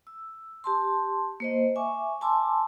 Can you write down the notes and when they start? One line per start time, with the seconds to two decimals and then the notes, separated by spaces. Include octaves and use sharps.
0.07 E6
0.64 G4 A5 C6
1.40 A#3 C5 D#5
1.76 E5 G#5 C#6 D6
2.21 G#5 A5 B5 C6 D6 E6